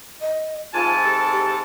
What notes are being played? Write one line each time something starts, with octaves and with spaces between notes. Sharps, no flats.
D#5
G#2 C3 F4 G#5 A5
G4 A4
G4